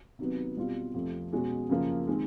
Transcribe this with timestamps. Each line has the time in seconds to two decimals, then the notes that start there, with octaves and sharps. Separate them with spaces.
0.19 C3 D#3 F#3 B3
0.56 B2 G3 C4 F4
0.94 F2 C3 F3 A3
1.32 B2 G#3 C#4 F#4
1.69 F#2 C#3 F3 A#3
2.07 D#3 G#3 C4